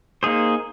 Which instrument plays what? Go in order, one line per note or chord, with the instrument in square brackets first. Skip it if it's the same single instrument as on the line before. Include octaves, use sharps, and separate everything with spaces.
[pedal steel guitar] A#3 D#4 G#4 C5